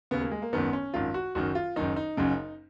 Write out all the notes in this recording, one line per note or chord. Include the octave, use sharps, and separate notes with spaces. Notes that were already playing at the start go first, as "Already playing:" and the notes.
D#2 C#3 B3
A#3
G#3
A#3
G#1 F#2 D#3 B3
C#4
G#1 F#2 D#3 F4
F#4
F#1 F#2 D#3 F#4
F4
F#1 F#2 D#3 D#4
D#4
F#1 F#2 C#3